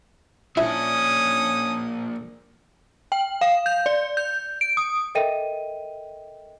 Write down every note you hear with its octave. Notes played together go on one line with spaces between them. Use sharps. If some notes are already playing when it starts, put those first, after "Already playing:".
A#2 C#4 D4 E4 D#6
G5
F5
G6
D5
G6
D7
D#6
A4 A#4 D#5 E5 G5 D#7